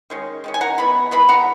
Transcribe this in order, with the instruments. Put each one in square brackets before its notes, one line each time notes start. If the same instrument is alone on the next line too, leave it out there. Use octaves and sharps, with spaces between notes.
[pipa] D#3 G#3 C#4
D#3 G#3 C#4
G#5
F#5 A#5
E3 G#3 B3 B5
E3 G#3 B3 B5
F#5 A#5